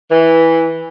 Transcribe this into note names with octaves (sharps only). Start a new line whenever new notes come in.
E3